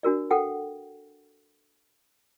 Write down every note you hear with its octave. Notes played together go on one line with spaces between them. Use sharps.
D4 F#4 A#4 D5
A4 F#5 G5